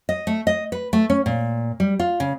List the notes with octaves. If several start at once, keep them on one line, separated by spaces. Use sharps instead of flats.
D#5
A3
D#5
B4
A3
C#4
A#2
G3
F4
C#3